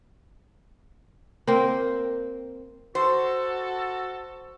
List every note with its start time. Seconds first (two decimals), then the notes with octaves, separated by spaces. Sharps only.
1.47 A#3 C4
2.95 F#4 A4 C5